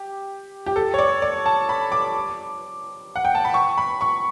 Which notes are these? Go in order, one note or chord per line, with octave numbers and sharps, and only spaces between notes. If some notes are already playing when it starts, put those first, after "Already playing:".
Already playing: G4
G4
A4
C#5
D5
D5
A5
B5
D6
F#5
G5
A5
B5
C#6
B5
C#6